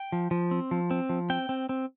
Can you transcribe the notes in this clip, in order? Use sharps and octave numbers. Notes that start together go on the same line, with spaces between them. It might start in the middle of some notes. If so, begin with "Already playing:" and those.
Already playing: G5
F3
F3
C4
F3
C4
F3
C4 G5
C4
C4